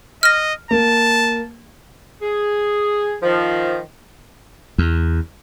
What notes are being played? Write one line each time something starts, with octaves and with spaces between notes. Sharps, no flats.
D#5 F6 A#6
A#3 A5
G#4
D#3 F3
E2